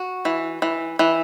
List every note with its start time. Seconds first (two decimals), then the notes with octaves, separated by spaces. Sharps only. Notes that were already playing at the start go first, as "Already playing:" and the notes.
Already playing: F#4
0.25 E3
0.62 E3
0.99 E3